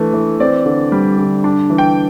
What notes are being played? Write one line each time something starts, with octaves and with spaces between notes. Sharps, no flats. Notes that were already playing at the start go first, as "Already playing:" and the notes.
Already playing: E3 A3 D4
E3
C4 D5
D3
G3
D3
D4
E3
G5